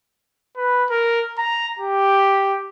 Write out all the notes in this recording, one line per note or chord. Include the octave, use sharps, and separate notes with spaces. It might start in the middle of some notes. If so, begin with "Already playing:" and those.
B4
A#4
A#5
G4